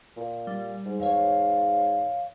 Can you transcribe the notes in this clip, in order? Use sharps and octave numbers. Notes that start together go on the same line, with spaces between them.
A#2
G3
G#2
E2 C#5 F5